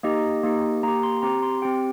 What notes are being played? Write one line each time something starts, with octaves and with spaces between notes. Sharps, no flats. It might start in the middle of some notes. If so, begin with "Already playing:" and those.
A#3 D#4 G4 D#5
A#3 D#4 G4
A#3 G4 A#5
C6
C4 G4 A#5
C6
C4 G4 G5